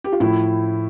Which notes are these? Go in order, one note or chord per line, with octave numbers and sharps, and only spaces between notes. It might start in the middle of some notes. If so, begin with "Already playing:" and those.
G4
F4
A2 F3 A3 E4